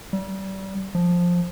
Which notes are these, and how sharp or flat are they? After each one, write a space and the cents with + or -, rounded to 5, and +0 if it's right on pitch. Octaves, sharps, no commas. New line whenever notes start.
G3 -30
F3 +10